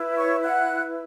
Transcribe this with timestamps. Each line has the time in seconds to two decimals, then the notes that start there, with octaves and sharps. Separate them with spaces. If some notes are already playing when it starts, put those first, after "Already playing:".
Already playing: E4 B4
0.17 C#5 C#6
0.44 F#5 F#6